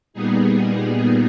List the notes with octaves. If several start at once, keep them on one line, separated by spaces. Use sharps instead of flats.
A#2 G3 B3 D#4 G#4